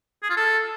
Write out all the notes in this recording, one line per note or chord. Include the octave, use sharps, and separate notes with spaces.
G#4
F4
A4